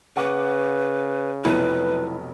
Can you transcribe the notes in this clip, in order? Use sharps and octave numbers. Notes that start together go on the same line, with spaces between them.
C#3 B4 F#5 C#6 D6
F1 B1 B3 E4 B4